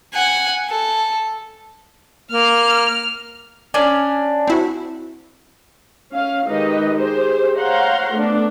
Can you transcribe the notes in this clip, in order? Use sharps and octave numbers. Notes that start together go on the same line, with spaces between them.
F#5 G#5
A4
A#3 F6
C#4 D4 G#5
C4 E4 F#4
C#4 F5
D#3 G#3 D#4 G4 B4 D#5
G4 G#4 C5
C5 C#5 F5 F#5 A#5 C6
A3 B3 D4